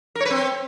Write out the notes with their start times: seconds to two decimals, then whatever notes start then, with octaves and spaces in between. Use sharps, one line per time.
0.15 A#4
0.20 C#5
0.25 B4
0.30 C4